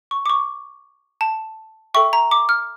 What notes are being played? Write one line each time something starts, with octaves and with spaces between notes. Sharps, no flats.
C#6
D6
C#6
A5
A4 E5 G5 C#6
A#5
D6
F6